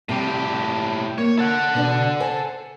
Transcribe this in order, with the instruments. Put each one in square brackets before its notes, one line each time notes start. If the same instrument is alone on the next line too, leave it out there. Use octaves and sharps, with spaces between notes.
[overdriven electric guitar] A2 G4 [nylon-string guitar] C3 G3
[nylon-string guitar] A#3 [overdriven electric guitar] C#5
[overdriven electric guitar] A4 F#5
[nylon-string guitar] B2 D4 D5
C5 G#5